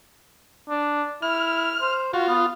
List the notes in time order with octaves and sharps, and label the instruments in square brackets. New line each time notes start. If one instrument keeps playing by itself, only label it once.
[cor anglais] D4
[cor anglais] E4 [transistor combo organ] F6
[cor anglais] C5
[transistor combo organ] F4 [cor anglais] F#4
[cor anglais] B3